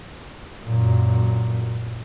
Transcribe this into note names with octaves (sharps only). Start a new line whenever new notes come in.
F#2 A#2